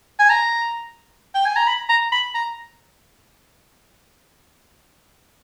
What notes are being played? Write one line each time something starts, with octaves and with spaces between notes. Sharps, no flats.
G#5
A#5
G5
G#5
A#5
B5
A#5
B5
A#5